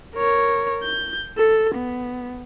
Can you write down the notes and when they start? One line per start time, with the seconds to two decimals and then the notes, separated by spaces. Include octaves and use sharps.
0.16 A#4 C#5
0.83 G6
1.37 A4
1.75 B3